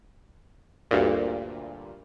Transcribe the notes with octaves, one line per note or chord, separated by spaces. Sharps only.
D2 G2 A#2